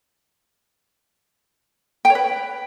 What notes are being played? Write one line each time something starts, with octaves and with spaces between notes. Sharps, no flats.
G5
C#5
B4